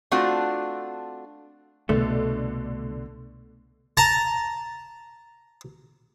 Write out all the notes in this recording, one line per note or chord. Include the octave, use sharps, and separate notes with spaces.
A3 C4 D4 F4 F#4
C2 B2 D3 A3
A5 A#5